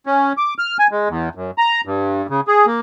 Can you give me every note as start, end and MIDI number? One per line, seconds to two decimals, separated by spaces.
0.06 0.33 61
0.37 0.54 86
0.58 0.77 89
0.79 0.87 80
0.91 1.09 56
1.09 1.29 40
1.35 1.51 42
1.58 1.81 82
1.85 2.27 43
2.29 2.41 49
2.48 2.66 68
2.66 2.80 58